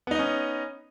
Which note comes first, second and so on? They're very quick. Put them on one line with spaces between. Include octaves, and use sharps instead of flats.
B3 D#4 D#5 C#4